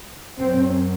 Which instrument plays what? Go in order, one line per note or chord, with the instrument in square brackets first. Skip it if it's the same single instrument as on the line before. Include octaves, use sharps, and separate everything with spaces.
[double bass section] F#2 C4